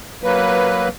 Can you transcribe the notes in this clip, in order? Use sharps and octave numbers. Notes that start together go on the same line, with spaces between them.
F#3 A#3 B4